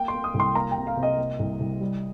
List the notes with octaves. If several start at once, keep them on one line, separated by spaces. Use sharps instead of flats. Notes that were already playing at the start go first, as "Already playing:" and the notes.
Already playing: A#3 G5
C6
A#3
D#6
C2
C6
A#3 A#5
G5
C3
F5
C3
D#5
A#3
C2
C2
G3